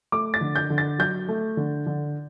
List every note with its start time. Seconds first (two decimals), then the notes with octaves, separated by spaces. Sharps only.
0.12 A3 D6
0.34 A6
0.41 D3
0.56 G6
0.70 D3
0.78 A6
0.99 F#3 G6
1.29 A3
1.57 D3
1.86 D3